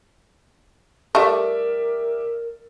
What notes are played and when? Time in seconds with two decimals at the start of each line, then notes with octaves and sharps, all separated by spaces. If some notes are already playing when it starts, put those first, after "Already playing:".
1.15 G3 A3 G4 A#4 D5 E5